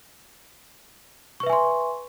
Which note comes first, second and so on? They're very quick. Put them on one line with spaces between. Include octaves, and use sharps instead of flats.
C#6 B4 E5 G#5 C6